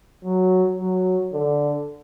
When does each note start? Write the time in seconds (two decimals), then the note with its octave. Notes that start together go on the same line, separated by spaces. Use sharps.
0.24 F#3
0.78 F#3
1.33 D3